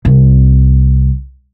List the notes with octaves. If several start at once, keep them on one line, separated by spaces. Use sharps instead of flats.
C2